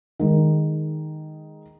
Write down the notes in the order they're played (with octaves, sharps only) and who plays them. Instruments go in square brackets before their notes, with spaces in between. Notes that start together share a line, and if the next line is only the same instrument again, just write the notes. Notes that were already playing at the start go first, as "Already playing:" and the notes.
[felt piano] D#3 G#3